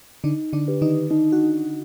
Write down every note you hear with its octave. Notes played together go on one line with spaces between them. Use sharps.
D3 D4 D#4
D3 D4
G4 B4
D#3 D#4
D#4
F#4